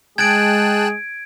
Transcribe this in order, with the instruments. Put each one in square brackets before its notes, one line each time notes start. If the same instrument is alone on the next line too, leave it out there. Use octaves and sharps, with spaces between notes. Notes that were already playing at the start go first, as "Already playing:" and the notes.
[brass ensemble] G#3 [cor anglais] G#4 [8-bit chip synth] G5 A5 F#6 [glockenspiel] G#6 D7